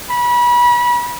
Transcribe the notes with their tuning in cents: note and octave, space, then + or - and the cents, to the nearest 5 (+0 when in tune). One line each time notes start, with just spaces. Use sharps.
B5 -30